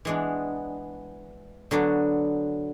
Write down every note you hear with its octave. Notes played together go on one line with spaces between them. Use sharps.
E3 G#3 B3 D4
D3 F#3 B3 D4